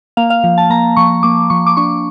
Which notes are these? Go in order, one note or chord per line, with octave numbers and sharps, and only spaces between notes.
A#3 F5
F5
F3
A5
A#3 A#5
F3 C#6
A#3 D6
F3 C#6
D6
D4 C#6